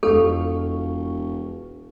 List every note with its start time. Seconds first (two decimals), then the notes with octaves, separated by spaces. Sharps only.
0.03 E1 F2 A4 F5 C#6